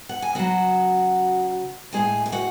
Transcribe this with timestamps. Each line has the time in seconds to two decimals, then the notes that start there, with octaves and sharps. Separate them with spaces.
0.09 F#5
0.22 G#5
0.35 C#3 F#3 F#4 F#5
1.93 A2 G#3 G#4 G#5
2.26 G#5
2.32 F#4 F#5